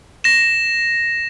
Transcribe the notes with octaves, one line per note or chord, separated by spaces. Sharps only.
A#6 E7